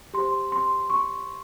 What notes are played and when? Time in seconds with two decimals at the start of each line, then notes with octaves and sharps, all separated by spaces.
0.14 G4 C5 C6
0.52 C6
0.90 C#6